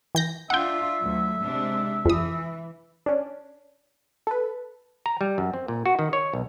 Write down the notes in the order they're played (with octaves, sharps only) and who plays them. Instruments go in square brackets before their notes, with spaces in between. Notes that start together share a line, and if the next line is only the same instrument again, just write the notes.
[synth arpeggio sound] E3 G6 A#6
[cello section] D4 F4 [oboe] E5 [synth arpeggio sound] F#5 G5
[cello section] D2 F#3
C3 G#3 D4
[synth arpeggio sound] F2 D#6 [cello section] E3
[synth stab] C#4 D4
A4 B4
[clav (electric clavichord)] A#5
G3
F#2
C4
A#2
F#4
D#3
C#5
B1